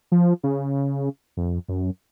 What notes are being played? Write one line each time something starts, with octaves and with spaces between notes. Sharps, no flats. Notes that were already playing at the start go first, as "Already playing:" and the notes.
F3
C#3
F2
F#2